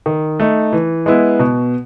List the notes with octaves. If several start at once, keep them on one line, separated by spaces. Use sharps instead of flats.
D#3
A3 D#4
E3
G#3 B3 E4
B2